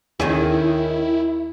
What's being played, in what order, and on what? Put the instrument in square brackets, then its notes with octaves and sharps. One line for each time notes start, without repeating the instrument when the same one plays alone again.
[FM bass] D#2 [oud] D#3 C#4 G#4 [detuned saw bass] E4